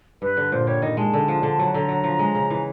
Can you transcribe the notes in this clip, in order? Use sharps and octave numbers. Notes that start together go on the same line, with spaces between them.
G2 B4
D3
A#2 C5
G3 C#5
D#3 D#5
G#3 A5
D3
F3
D3
F#3
D3 A#5
F#3
F3
G#3
C#3
E3